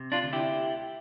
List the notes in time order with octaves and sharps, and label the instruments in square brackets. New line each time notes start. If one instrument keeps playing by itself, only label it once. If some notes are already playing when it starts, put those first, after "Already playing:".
Already playing: [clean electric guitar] C3
D4 F4
D2
E4 G4